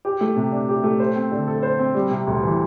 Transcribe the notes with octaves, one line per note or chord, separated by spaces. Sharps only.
G4
A3
C3
D4
G4
A3
C5
C4
D3
A4
C5
C4
G3
C3
D2
E3